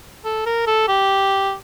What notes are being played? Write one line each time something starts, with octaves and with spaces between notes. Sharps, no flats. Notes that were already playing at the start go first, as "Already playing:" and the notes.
A4
A#4
A4
G4